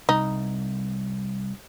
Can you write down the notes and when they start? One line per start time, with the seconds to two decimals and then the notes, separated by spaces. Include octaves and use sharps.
0.09 C2 D#4